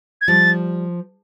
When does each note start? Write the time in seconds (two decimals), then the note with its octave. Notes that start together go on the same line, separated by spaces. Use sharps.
0.21 G#6
0.28 F3 G3 A6